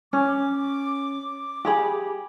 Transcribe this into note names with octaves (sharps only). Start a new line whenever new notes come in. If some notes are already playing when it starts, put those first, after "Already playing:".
C#4 D6
G4 G#4 B5